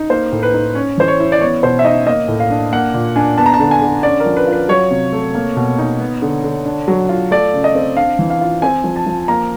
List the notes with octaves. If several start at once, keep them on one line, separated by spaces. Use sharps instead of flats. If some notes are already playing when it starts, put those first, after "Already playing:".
Already playing: D#4
A#3 C5
A2
B4
D#4
C#4 C#5
E3 C5
C#5
E4
D5
B3 C#5
B2 C5
E5
D#4 D#5
A#3 D#5
A2
F5
D4
A#3 F#5
A#2
D4 G#5
B3 A5
A#5
A5
D3
G#5
D3
C#4 D5
A#4
F3
B4
F4
B4
F#3 C#5
C3
A3
A#3
B2
D#4
B3
D3
D3
D4
F#3
F4
A3 D5
C#3
D#5
C4
D4 F5
E3
F5
F4
C4 G#5
F3
A5
F3
A#3 A#5